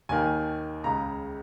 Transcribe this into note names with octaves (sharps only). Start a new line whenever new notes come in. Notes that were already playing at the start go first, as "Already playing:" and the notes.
D#2 D#3 G#5
C#2 C#3 A#5